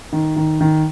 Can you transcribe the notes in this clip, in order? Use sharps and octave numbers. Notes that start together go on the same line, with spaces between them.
D#3
D#3
D#3